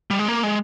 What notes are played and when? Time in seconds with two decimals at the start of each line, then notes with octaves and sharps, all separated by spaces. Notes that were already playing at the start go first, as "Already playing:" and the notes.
0.10 G3
0.19 G#3
0.28 A#3
0.43 G#3